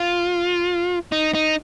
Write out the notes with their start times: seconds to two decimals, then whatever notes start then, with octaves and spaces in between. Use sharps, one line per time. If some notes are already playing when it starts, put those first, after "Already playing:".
Already playing: F4
1.12 D#4
1.35 D#4